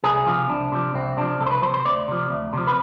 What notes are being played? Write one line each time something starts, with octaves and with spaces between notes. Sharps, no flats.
C2 G#4
C3 F3 F4
C2 D4
C3 F3
C2 C4
C3 F3 D4
C2 A4
C5
B4
F3 C5
C3
C5
D2 D5
C3 F3
D2
C3 F3
B4